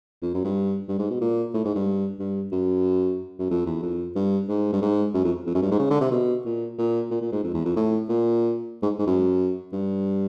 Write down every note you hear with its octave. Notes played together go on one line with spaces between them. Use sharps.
F2
F#2
G2
G2
G#2
B2
A#2
A2
G#2
G2
G2
F#2
F#2
F2
E2
F2
G2
G#2
G2
G#2
F#2
F2
F2
F#2
G2
G#2
C#3
D3
C3
B2
A#2
A#2
A#2
A#2
G#2
F2
E2
F2
A2
A#2
G#2
G#2
F#2
G2